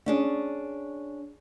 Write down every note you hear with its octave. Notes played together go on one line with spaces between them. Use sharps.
C#4 D4 G#4